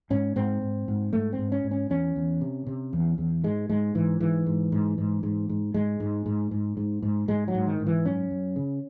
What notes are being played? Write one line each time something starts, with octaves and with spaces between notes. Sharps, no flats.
G#2 C#4
G#2 C4
G#2
G#2
G#2 A3
C4
G#2
C#4
G#2
C#4
E2 C#4
E2
C3
C3
E2
E2
G#2 G#3
G#2 G#3
G#2 E3
G#2 E3
G#2
G#2
G#2
G#2
G#2
G#2 G#3
G#2
G#2
G#2
G#2
G#2
G#2 G#3
F#3
G#2
D#3
G#2
E3
F#2 C#4
F#2
C#3